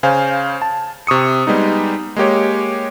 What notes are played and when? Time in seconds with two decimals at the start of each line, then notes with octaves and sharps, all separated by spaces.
0.03 C#3 C5 F5 G#5
0.62 A5
1.07 C3 C#6 D#6 C#7
1.47 G3 G#3 B3 D#4
2.16 G#3 A#3 G4 C#5